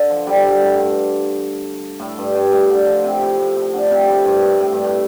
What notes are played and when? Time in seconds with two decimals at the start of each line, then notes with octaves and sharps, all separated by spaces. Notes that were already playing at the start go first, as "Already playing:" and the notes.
Already playing: D3
0.10 F3
0.27 D3 G3
0.61 A2
0.79 G2
2.00 A2
2.18 G2
2.34 G2
2.52 A2
2.70 D3
2.86 F3
3.04 C3
3.21 A2
3.39 A2
3.56 A2
3.73 D3
3.91 C3
4.09 A2
4.25 G2
4.43 A2
4.60 A2
4.72 G2
4.84 A2